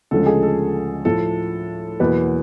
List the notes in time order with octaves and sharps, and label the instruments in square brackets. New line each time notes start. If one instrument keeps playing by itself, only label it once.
[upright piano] D2 C#3 F3 G#3 A4
G#4
A4
A2 F3 A3 A4
E2 B2 F#3 A#3 B4